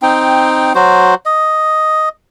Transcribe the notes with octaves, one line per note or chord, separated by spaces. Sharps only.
C4 D#4 G5
F#3 F#4 C5
D#5